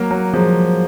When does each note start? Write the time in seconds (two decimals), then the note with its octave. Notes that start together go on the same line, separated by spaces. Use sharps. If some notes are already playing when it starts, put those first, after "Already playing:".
Already playing: F#3 A#3
0.11 F#3
0.33 F3 G#3